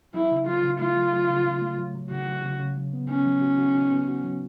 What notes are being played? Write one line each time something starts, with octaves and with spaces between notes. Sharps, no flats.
F#3 E4
C#3
F#3 F4
C#3
A3 F4
F#3
F#3
C#3
C#3
A3
F#3
F#3
C#3 F#4
F#3
C#3
C#3
F#3
B3
B3 C#4
F#3
F#4
F#4
D#4
B3
F#4
F#3